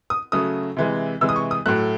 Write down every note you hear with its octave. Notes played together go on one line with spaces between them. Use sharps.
D#6
C#3 F#3 A3 D#6
C3 E3 G#3
C3 E3 G#3 E6
D#6
C#6
D#6
A2 F#3 A3 F#6